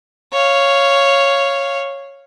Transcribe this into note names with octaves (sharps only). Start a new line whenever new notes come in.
C#5 F5